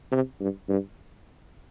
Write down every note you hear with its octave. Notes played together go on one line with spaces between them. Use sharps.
C3
G2
G2